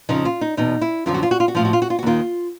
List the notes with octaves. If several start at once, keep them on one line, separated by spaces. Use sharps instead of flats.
F2 C#3 F3 D#4
F4
D#4
E2 B2 D#4
E4
F#2 D3 F3 F4
F#4
F4
F#4
F4
F#4
A2 F3 F4
F#4
F4
F#4
F4
F#4
D#2 D#3 F4